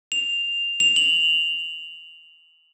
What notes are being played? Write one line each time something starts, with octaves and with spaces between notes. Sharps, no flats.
F7
F7
F#7